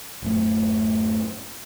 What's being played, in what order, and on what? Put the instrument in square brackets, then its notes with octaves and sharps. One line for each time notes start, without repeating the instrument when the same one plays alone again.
[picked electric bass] D1 F#2 A3